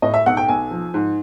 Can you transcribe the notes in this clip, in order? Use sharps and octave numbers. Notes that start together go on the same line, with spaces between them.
A2 D#5
E5
B1 F#5
G5
B1 G#5
F3
G#2